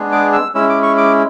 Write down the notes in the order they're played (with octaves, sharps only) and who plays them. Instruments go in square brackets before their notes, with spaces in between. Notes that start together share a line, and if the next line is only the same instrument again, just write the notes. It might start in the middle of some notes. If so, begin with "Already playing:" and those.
Already playing: [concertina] G#3 B3 D4 G#4
D6
E6
G#3 C#4 E4 E6
D6
C#6
D6